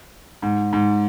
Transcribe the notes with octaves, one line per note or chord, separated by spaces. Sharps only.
G#2
G#2